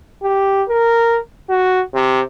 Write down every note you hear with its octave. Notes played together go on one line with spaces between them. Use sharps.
G4
A#4
F#4
C3